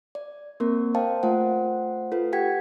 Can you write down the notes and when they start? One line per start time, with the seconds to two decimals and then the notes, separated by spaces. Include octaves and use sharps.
0.15 D5
0.60 A#3 C4 A#4
0.95 A#4 C5 D#5 F5 G5 A5
1.23 A3 F4 C5 F#5
2.12 F4 A4 B4
2.33 G4 F#5 G5 G#6 B6